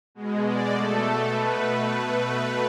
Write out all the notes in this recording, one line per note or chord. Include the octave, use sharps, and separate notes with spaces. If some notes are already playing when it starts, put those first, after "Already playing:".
B2 G#3
D5
B2 A3 A4
B2 A3 B4